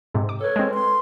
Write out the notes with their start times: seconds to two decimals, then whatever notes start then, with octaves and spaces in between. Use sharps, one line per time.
0.14 G#2 C3
0.29 D6
0.41 A4 B4 C#5
0.56 G#3 C4
0.74 C6